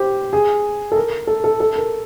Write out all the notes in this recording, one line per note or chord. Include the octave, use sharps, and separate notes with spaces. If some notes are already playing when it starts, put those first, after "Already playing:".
Already playing: G4 C5
G#4
A4
A#4
A4
A4
A4
A#4